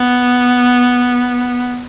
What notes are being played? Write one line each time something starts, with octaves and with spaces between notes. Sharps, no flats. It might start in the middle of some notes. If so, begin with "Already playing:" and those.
Already playing: B3